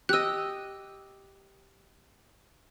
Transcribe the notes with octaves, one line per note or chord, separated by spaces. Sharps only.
G4 D#5 E6 F#6